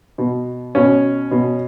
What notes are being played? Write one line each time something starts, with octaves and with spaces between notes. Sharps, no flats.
B2
B2 C#4
B2